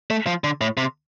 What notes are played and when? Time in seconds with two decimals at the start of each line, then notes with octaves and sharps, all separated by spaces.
0.10 A3
0.27 F3
0.44 D3
0.61 A2
0.77 C3